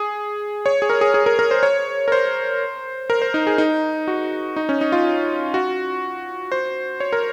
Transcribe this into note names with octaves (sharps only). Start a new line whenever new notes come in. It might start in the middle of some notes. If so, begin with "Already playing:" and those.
Already playing: G#4
C#5
G#4
A#4
G#4
G#4
A#4
A#4
C5
C#5
A#4
C5
A#4
C5
D#4
G#4
D#4
F#4
D#4
C#4
D#4
F4
F#4
C5
C#5
A#4